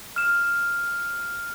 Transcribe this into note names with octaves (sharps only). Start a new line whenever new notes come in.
F6 E7